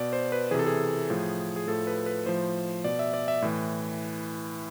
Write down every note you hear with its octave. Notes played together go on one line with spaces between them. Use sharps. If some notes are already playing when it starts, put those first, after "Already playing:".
Already playing: B2 D5
C5
B4
C3 E3 G#4 A4
G#4
A2 F3
G#4
A2 F3 A4
B4
B4
A2 F3 C5
B2 D5
E5
D5
E5
A2 E3